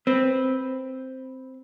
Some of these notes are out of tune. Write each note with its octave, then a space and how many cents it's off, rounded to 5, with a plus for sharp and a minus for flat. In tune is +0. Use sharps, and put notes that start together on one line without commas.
C4 +0 B4 +0